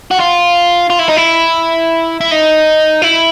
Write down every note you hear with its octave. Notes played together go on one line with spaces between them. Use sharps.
F#4
F4
F4
E4
D#4
E4
E4
D#4
E4